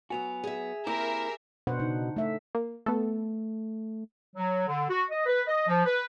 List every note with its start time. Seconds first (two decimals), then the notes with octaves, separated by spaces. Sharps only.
0.10 F#3 B3 F#4 G#5 F7
0.44 G#4 E5
0.87 A#3 C4 E4 G4 G#4 A#4 E5 D6
1.67 B2 D4 C5 F#5
1.79 C#3 D4 D#4
2.16 A3 E5
2.55 A#3
2.86 A3 B3 A4
4.36 F#3
4.68 D3
4.90 F#4
5.11 D#5
5.26 B4
5.47 D#5
5.67 F3
5.86 B4